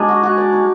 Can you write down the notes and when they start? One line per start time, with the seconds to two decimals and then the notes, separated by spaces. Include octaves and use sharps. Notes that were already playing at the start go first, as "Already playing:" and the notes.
Already playing: F#3 G#3 D4 D#4
0.08 F#4
0.23 F#4
0.38 D5
0.53 D#4